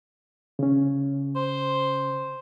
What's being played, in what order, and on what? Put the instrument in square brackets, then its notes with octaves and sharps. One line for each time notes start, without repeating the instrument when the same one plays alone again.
[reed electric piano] C#3 C#4
[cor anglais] C5